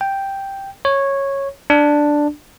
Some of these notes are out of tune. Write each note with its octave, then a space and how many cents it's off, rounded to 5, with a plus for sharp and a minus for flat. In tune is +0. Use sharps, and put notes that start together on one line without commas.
G5 +0
C#5 -10
D4 +5